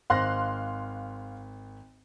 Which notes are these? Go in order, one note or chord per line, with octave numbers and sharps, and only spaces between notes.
G#1 C5 F5 C6 F#6 A#6